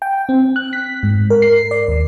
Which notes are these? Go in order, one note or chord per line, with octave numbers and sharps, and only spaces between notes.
G5
C4
F#6
B6
G#2
A#4
C7
D5
D#2